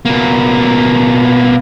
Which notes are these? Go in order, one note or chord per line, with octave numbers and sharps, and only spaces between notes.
B2 A#3